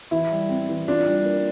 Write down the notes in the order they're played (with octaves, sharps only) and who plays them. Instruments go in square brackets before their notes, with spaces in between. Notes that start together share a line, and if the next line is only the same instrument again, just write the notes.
[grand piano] E3 [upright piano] E4
[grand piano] G3
C4
E3
[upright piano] D4 [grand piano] F4
[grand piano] G3
A#3